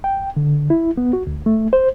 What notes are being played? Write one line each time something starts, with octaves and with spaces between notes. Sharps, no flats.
G5
D3
E4
B3
F#4
D2
A3
C5